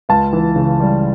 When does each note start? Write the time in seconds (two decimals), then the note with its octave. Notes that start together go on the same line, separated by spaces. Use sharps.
0.09 C#2 F5 A5
0.33 E3
0.56 C#3
0.80 G3